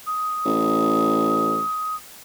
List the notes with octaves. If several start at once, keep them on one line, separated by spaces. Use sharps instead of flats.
D#6
A1